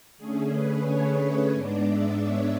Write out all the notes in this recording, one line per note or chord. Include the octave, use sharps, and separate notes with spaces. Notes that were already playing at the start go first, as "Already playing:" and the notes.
D3 A3 C#4 G#4
B4
C#5
G#2 G#3 B3 D4 D5
E5
C#5